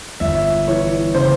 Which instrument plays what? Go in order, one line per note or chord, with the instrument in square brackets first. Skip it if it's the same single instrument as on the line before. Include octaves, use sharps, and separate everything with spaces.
[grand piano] G1 E5
E3 C#5
C#3 C5